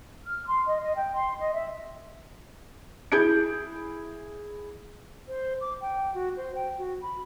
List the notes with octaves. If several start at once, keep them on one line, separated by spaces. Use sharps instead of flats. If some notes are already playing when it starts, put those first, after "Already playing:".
F6
C6
D#5
D#5
G5
C6
D#5
E5
E4 G#4 G6 G#6 D7
C5
D6
G5
F#4
C5
G5
F#4
B5